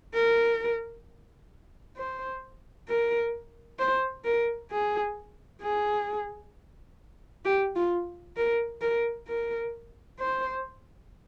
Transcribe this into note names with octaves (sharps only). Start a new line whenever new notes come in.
A#4
C5
A#4
C5
A#4
G#4
G#4
G4
F4
A#4
A#4
A#4
C5